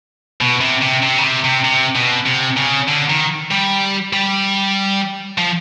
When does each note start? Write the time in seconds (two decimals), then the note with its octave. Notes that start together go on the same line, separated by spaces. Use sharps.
0.41 B2
0.61 C3
0.82 C3
1.03 C3
1.18 C#3
1.23 C3
1.44 C3
1.65 C3
1.96 B2
2.27 C3
2.57 C#3
2.89 D3
3.10 D#3
3.51 G3
4.13 G3
5.38 F3